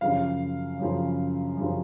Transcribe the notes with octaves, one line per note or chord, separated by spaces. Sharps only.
F#2 C#3 F3 F5
F#2 C#3 F3
F#2 C#3 F3